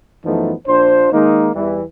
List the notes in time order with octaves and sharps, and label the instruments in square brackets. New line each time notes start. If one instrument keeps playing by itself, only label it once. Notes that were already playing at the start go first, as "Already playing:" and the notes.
[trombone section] F#2 E3 F3 A3 B3 D#4
A#1 D4 F4 C5
D#3 G#3 A#3 D#4
E2 E3 G3